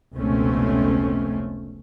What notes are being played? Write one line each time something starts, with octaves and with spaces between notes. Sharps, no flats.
F1 C#2 B2 A3 C4 C#4